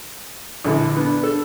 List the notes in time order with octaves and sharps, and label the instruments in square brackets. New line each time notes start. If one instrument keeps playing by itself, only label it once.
[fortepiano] A#1 D3 E3
[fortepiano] B3 [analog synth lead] D4
[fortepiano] A4